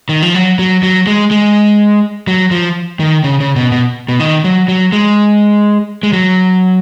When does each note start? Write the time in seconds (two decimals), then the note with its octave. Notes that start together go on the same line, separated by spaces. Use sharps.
0.09 D#3
0.22 F3
0.34 F#3
0.59 F#3
0.83 F#3
1.07 G#3
1.31 G#3
2.28 F#3
2.51 F3
3.00 D#3
3.24 C#3
3.40 C#3
3.56 B2
3.72 B2
4.08 B2
4.20 D#3
4.44 F#3
4.68 F#3
4.92 G#3
6.03 G#3
6.13 F#3